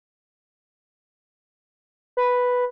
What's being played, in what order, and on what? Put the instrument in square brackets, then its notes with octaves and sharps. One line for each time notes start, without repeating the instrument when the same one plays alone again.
[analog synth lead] B4